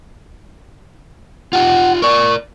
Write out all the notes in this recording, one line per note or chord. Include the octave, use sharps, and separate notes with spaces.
F4 G4 F#5
A#4 D5 C#6